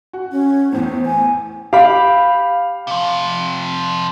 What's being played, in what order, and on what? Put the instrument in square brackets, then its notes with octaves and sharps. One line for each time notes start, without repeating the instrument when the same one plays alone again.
[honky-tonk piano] F#4
[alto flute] C#4
[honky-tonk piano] E2 A2 [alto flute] C5
[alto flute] G#5
[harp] G4 B5 [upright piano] F5
[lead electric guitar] C3 F3